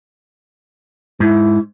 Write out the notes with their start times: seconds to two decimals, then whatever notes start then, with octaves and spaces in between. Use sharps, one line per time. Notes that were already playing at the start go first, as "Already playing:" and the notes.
1.20 G#2 E4